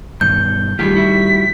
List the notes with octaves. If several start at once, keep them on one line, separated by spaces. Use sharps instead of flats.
G2 B2 D#3 G6
A2 D#3 G3 F4 G4 G#4 B6
E4 F#4 E5